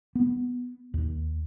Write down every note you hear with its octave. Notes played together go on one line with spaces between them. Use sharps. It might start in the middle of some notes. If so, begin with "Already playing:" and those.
B3
D#2